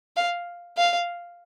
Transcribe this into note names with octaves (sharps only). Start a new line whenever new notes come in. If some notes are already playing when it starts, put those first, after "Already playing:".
F5
F5